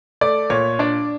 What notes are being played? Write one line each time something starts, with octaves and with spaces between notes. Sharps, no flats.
A3 D5
A#2 C#5
D4 D5